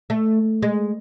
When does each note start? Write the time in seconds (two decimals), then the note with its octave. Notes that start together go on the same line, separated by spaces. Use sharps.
0.10 A3
0.62 G#3